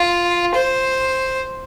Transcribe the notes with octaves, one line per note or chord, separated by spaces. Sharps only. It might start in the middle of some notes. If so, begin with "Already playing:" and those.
Already playing: F4
C5